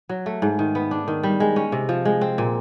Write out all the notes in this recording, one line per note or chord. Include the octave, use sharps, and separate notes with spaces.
F#3
A3
G#2
D#3
B3
D4
D#3
G3
G#3
C#4
C3
F3
G#3
C4
A#2